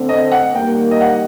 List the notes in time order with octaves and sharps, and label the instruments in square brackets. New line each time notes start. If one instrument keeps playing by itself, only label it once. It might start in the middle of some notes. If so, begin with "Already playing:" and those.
Already playing: [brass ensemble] D3 A3 C4
[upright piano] D#5
F#5
[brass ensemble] D#3 G3 A#3 [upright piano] G5
[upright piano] D#5
F#5